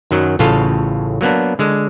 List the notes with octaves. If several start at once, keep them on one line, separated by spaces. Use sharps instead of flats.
F#2 D#3 F#3
A1 A2 C#3 F4 A4 F5
F#3 A#3 B3 D4
D3 G#3